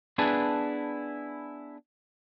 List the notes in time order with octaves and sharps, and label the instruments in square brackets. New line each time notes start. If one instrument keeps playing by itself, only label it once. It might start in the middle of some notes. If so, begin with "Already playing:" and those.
[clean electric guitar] B3 D4 E4 G#4 B4 A5